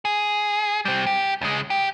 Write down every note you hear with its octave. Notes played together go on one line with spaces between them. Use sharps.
G#4
G3 C4
G4
C#2 G#3
G4